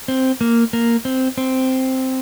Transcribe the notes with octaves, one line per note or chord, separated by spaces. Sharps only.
C4
A#3
A#3
C4
C4